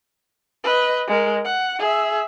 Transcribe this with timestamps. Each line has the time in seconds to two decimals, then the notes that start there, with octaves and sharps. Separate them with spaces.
0.64 B4 D#5
1.07 G#3 A#4
1.45 F#5
1.79 G#4 E5